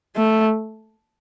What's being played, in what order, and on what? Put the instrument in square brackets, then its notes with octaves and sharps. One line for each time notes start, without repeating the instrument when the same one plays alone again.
[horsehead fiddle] A3